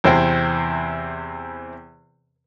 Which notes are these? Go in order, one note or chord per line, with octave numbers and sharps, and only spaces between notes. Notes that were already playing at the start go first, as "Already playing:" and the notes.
E2 C3 C4 E4 C5 G5